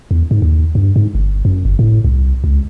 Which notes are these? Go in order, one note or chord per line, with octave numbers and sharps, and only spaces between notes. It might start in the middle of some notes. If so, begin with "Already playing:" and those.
E2
G#2
D#2
G2
G#2
G1
F#2
G1
A2
C2
C#2